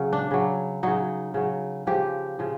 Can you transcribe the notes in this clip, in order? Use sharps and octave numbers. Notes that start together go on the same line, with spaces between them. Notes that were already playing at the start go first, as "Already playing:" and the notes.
Already playing: C#3 F#3
D4
C#3 F#3
C#3 F#3 D#4
C#3 F#3
C#3 F3 G4
C#3 F3